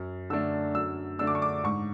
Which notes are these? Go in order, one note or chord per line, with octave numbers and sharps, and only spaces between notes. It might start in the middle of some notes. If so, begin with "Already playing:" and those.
Already playing: F#2
D3 A3 D4 E6
F#2 E6
D3 A3 D4 E6
D6
C#6
D6
G#2 C#6